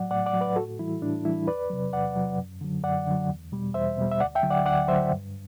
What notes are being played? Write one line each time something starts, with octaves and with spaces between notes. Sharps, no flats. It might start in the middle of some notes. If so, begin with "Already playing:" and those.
Already playing: A2 F#3 D5 F#5
A2 D5 F#5
D5 F#5
F#3
B4 D5
A2 F#4 A4
E3 G3 E4
A2 D4
E3 G3 E4
E2 B4 D5
C3 F#3
E2 D5 F#5
C3 F#3
F#2
D3 F#3
F#2 D5 F#5
D3 F#3
E2
B2 G3
E2 C5 E5
B2 G3
E5
D2 D5 F#5
E5 G5
D3 F#3
D5 F#5
D2 D5 F#5
D3 F#3 C5 E5
G2